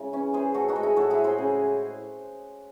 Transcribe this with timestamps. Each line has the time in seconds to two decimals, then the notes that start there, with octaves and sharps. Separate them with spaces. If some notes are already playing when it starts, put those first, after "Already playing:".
Already playing: C#3 G#3 E4
0.13 E3 C#4
0.33 E3 G#4 C5
0.54 A2 F#4 A4
0.68 D#4 F#4
0.76 G#3
0.83 E4 G#4
0.96 A2 F#4 A4
1.10 E4 G#4
1.18 A2
1.24 G#4 C5
1.38 C#3